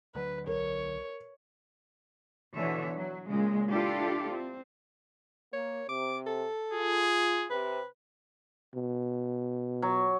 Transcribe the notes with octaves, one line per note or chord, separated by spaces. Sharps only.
D2 D3 F#3 B4
B1 A#4 C#5
B2 D3 E3 C#5 E5
F#3
A#2 C#3 G#3
D4 E4 F4 G4 A4 D5
C4
A#3 C#5
C3 D6
A4
F4 G#4
C3 B4
B2
F#3